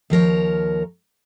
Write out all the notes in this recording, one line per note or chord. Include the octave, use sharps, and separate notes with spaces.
D#2 F3 A#4 C#5